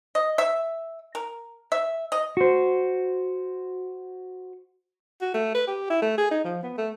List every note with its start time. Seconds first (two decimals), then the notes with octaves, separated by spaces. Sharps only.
0.15 D#5
0.38 E5
1.15 A#4
1.72 E5
2.12 D#5
2.37 F#4 C5
5.22 F#4
5.34 A3
5.55 B4
5.68 G4
5.90 E4
6.02 A3
6.18 G#4
6.31 D#4
6.45 F3
6.63 B3
6.78 A3